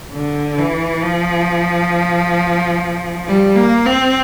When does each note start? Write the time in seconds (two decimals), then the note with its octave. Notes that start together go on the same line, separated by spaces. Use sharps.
0.13 D3
0.58 E3
1.03 F3
3.27 G3
3.56 A#3
3.86 C4